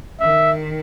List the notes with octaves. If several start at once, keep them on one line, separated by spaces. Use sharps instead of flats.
D#3 E5